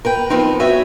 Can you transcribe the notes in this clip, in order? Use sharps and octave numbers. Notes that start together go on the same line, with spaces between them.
A#4 B4 G5
F3 B3 C4 D#4
F#4 B4 C#5 D#5 E5